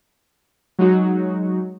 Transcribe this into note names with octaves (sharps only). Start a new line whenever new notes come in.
F#3 G#3 D#4 F#4